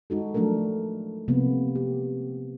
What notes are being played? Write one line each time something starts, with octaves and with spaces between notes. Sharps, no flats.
G#3 D#4 F#4 A4
F3 F#3 A3 D4 A4 A#4
C3 F3 G3 A#3 B3
G4